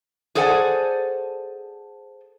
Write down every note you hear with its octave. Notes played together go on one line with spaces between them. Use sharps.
G#4 A4 C5 D5 F#5 G#5